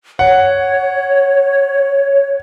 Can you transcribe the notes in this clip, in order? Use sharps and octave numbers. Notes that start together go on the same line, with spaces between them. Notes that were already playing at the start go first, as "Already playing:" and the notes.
C#5 F#5